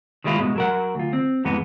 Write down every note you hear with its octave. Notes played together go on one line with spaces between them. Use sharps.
D#3 G3 G#3 E4 F4
G#2 B2 G#3
F#3 A#4 F#5
D2 F4
C4
F2 G#2 E3 G#3 B3